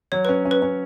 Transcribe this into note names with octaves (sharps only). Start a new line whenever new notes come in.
F#3 C#5
C#4 B4
C#4
B4
C#4